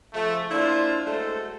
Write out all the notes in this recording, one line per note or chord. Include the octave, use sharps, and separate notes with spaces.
C#3 F3 A3
A#3 D4 E4 F4 C5
F#3 G#3 A3 A4 C5